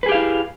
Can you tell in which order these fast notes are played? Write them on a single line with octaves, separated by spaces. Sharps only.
B4 G#4 G4 F5 E4